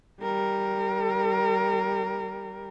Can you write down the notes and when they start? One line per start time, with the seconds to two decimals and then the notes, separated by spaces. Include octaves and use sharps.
0.21 G3 A#4